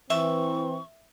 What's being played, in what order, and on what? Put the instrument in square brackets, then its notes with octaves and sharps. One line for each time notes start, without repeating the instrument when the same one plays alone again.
[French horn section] E3 [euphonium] C4 [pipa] E5 [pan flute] C#6